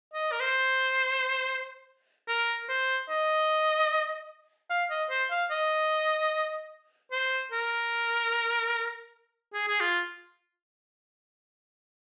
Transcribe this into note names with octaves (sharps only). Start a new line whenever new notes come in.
D#5
A#4
C5
A#4
C5
D#5
F5
D#5
C5
F5
D#5
C5
A#4
G#4
G#4
F4